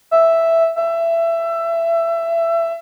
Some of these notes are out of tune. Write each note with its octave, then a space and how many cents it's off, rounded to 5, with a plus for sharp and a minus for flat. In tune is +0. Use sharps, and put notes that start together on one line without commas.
E5 +0
E5 +20